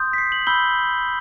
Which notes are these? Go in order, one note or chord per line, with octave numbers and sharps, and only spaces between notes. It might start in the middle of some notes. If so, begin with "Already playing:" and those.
Already playing: C6 D#6 G6
B6
C7
F#7
B5 E6 G6 G7